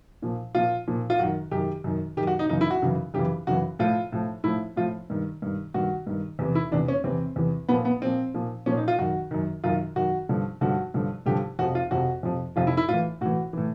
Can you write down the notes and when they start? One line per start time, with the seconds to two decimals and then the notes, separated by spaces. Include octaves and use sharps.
0.22 A#2 F3
0.55 A#2 F3 F4
0.87 A#2 F3
1.10 F4
1.19 F#2 D#3 F#4
1.51 F#2 D#3 G4
1.84 F#2 D#3
2.17 D#3 G4
2.21 F#2
2.27 F#4
2.39 D#4
2.49 F#2 C#3 E3 D#4
2.61 E4
2.71 F#4
2.82 F#2 C#3 E3
3.14 F#2 C#3 E3 G4
3.47 F#2 C#3 E3 F#4
3.79 A2 F3 F4
4.12 A2 F3
4.44 A2 F3 E4
4.76 A2 F3 F4
5.10 G2 D#3
5.42 G2 D#3
5.74 G2 D#3 F#4
6.07 G2 D#3
6.39 E2 C3 E3
6.55 E4
6.71 E2 C3 E3 D4
6.88 C#4
7.04 E2 C3 E3 C4
7.36 E2 C3 E3
7.69 A#2 F3 B3
7.85 B3
8.01 A#2 F3 C4
8.34 A#2 F3
8.66 A#2 F3 C#4
8.77 D#4
8.88 F4
8.98 F#2 D#3 F#4
9.31 F#2 D#3
9.64 F#2 D#3 F4
9.96 F#2 D#3 F#4
10.29 G2 D3 F3
10.61 G2 D3 F3 F#4
10.94 G2 D3 F3
11.26 G2 D3 F3 G4
11.59 F2 C3 F3 F#4
11.75 F4
11.91 F2 C3 F3 F#4
12.23 F2 C3 F3
12.56 F2 C3 F3 F4
12.67 E4
12.77 E4
12.89 A2 E3 F4
13.21 A2 E3 F#4
13.53 A2 E3